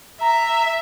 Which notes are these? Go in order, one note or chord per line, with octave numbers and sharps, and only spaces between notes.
E5 A#5